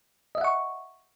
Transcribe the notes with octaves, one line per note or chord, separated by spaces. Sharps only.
D#5 E5 F#5 C#6